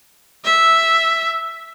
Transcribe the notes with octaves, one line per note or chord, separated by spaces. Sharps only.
E5